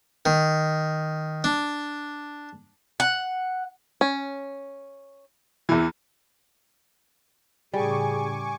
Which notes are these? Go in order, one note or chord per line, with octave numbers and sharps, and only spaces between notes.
D#3
D4
F#5
C#4
E2 E3
A2 C#3 G3 G#4 G#5 C#6 D6